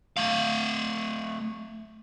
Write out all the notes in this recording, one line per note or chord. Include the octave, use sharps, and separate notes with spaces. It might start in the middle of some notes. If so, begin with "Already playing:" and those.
A3 F5